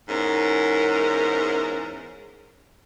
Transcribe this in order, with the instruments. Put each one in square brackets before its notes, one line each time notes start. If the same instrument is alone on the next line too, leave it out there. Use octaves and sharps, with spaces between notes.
[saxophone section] E2 G#2 C#4 A#4